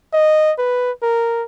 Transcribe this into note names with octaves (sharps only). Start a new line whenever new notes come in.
D#5
B4
A#4